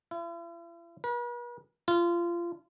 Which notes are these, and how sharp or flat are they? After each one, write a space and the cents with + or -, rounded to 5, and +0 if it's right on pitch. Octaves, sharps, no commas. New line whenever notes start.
E4 +45
B4 -45
F4 -25